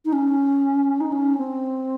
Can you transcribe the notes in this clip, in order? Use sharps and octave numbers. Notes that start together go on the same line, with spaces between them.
D#4
C#4
D#4
C#4
C4